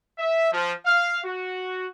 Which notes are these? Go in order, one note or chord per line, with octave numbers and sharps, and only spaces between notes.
E5
F3
F5
F#4